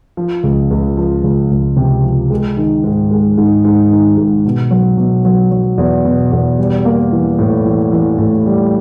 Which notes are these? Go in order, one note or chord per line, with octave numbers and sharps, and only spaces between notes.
F3
C#2
C#2
F3
C#2
C#2
C3
F3
G#3
D#3
G#2
G#3
G#2
G#2
D#3
G#2
B2
F#3
B2
F#3
F#3
E2
B2
E2
G3
A#3
E3
A2
E3
E3
A2
G3